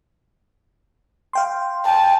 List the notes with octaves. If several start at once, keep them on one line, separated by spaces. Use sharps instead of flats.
F5 G5 C6
G5 A5